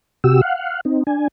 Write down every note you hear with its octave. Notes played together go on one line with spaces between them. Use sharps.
C3 F#4 G4 E6
F5 F#5
C4 D#4
D4 G#5